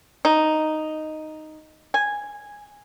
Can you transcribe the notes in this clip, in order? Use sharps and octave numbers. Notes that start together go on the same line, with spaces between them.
D#4
G#5